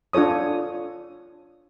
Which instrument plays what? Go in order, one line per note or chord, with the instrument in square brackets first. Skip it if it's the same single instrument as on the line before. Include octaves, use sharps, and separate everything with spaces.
[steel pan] D4 F4 A4 C#5 D#6